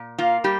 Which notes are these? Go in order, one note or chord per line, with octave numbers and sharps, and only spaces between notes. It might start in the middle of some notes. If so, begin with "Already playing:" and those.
Already playing: A#2
A#3 F4
G3 G4